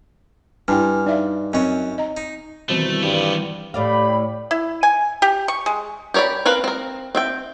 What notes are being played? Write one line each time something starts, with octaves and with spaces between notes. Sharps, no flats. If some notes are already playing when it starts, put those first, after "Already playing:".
G2 D4 E4 G5 G#5 F6
D#4 D5 E5 F5
F#2 C4 C#4 D#5
D#5 A#5
D#4
B2 D#3 E3 G3 A3 C4
G2 B3 G4
A2 G4 D5 F5 B5
E4
G#5
G4
C#6
G#3
G4 A#4 C#5 D5 B5
C4 A#4 B4 F5
C4 A#4
C4 E5 G5